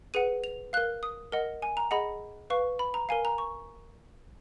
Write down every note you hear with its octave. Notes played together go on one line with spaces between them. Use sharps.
G#4 B4 F#5 D#7
F7
A#4 F5 F#6
D#6
A#4 D#5 F#5
G#5
A#5
G#4 D#5 F#5 B5
B4 F5 C#6
B5
A#5
A#4 F5 G#5
A#5
C#6